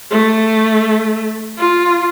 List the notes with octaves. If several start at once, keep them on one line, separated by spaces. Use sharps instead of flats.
A3
F4